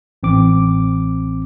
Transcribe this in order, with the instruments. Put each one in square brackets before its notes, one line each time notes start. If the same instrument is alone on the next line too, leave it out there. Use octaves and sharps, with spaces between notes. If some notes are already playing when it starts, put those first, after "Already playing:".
[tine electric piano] A1 C4 D6